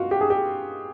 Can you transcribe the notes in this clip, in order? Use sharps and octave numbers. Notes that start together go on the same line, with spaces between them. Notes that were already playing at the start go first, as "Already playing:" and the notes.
Already playing: F4 F#4
G4
G#4
G4